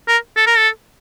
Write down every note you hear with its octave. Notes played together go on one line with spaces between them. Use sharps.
A#4
A4
A#4
A4